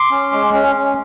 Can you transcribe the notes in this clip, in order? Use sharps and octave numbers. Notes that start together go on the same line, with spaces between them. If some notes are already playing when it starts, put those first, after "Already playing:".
Already playing: C6 D6
C#4
G#3
C#4
C#4